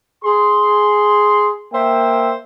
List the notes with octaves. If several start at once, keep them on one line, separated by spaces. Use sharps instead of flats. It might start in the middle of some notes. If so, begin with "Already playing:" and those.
G#4 C6
A#3 C5 E5 G5